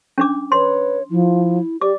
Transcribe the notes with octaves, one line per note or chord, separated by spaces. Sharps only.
C#4 D4 D6
B4 C#5 C6
F3 E4
G4 D5 D6